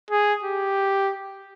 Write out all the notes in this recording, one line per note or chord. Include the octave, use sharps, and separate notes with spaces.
G#4
G4